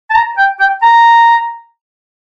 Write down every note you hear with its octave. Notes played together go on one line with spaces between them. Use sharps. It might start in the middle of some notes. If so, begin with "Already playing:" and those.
A5
A#5
G5
G5
A#5